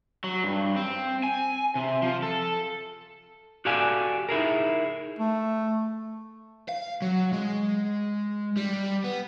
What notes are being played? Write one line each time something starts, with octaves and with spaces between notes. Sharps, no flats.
F#3
G2
C4
G#5
C3
F3
A4
F#4 G4 A4 D5 F5 G#5
D#4 E4 G#4 A#4
A3
F5
F#3
G#3
G3
B3